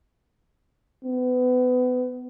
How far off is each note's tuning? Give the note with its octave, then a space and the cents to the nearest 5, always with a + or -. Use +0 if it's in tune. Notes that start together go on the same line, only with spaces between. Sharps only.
B3 +30